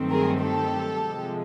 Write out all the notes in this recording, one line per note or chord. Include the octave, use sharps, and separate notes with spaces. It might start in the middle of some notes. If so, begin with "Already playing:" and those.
Already playing: G2 D#3 F#3 A3 C4
G#4 A#4
G4 A4
C3 F3 G#3